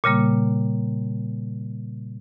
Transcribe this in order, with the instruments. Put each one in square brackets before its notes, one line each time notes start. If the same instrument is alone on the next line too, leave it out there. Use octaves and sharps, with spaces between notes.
[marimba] A#2 C#3 G3 A#3